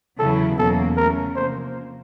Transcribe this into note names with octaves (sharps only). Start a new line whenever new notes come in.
E2 C#3 F#3 B3 E4 A4
E2 B2 F#3 A#3 C#4 A4
C#3 F#3 A3 C#4 A#4
C3 F3 A#3 C5